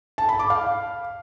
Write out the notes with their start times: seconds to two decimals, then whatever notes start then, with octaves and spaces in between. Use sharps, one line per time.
0.18 A5
0.29 B5
0.39 D6
0.50 F5